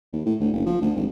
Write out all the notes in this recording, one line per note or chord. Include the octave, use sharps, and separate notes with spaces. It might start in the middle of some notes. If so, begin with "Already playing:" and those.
D#2
A2
D2
F#1
F3
D2
G#1